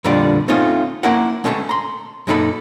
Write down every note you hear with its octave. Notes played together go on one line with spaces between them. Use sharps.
F2 A#2 D3 G3 F4 D5
A3 C4 C#4 D#4 F4
A#3 C#4 E4 A#4 F#5
G#3 A3 C#4 G#4 A4
A#5 C6
F#2 A#2 D#4 G4 A4 B5